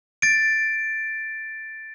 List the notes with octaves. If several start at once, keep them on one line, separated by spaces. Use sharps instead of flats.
A6 D7